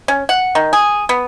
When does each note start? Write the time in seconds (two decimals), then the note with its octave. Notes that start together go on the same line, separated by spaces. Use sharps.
0.08 C#4
0.29 F#5
0.55 D#3
0.73 G#4
1.09 B3